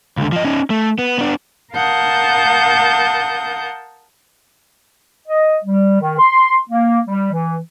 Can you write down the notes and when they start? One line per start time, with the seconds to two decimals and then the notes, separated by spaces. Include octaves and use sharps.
0.17 C#2 D3
0.32 F3 D#5
0.45 C#4 D#4
0.70 A3
0.99 B3
1.18 B3 D4
1.73 A#4 F5 F#5 A5 D#6 G6
5.28 D#5
5.64 G3
6.00 D#3
6.19 C6
6.68 A#3
7.07 G3
7.32 E3